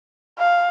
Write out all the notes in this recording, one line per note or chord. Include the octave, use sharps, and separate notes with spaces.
F5